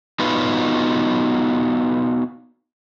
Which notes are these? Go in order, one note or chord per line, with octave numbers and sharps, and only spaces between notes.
B3 D#4 F4 F#4 B4